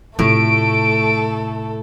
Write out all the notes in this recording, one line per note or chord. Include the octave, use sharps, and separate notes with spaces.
A2 C3 A3 F4 A4 D7